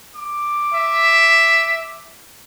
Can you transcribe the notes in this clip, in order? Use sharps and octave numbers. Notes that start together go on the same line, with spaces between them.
D6
E5